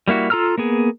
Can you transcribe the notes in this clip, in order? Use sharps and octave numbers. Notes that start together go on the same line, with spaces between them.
G3 A#3 E4 F#4
F4 A4 A#5 E6 F6
A#3 B3 G#4